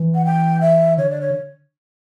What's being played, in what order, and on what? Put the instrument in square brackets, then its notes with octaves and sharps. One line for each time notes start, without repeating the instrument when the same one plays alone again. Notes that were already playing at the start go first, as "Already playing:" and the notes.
Already playing: [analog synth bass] E3
[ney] F#5
G5
E5
[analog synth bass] D3 [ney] C#5
[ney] D5
C#5